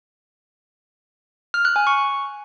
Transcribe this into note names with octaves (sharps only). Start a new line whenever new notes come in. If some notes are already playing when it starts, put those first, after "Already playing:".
F6
F#6
G#5
C#6